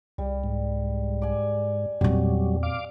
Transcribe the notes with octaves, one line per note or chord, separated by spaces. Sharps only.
C2 G3
G#2
D5 G#5
E2 A#2 F#3 G3 C4
F5 D6